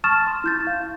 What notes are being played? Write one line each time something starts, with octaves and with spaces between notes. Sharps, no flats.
A5 C#6 D#6 F6 A6 E7
C6
E4 G6 A6
F5